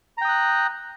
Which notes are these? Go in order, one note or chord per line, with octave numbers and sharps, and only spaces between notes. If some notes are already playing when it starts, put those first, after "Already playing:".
G5 A#5 D#6 F#6